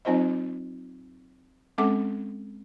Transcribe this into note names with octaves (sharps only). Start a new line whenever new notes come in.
F#3 C4 D#4 F4 C5 D#5
G#3 C4 C#4 A4 F#5 D6